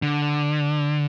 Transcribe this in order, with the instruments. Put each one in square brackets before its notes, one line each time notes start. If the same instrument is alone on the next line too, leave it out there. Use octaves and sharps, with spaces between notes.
[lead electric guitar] D3